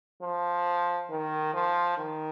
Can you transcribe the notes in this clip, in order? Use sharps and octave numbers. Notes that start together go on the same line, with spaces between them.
F3
D#3
F3
D#3